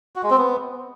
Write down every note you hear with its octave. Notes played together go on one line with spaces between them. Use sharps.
F#4
G#3
C4
B3